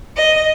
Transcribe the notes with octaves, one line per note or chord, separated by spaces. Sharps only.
D#5